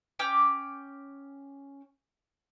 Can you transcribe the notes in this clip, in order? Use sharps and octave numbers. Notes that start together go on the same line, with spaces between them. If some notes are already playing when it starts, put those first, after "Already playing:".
C#4 G5 D6